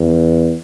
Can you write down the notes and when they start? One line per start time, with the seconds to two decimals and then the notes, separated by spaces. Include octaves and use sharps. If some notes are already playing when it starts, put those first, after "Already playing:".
Already playing: E2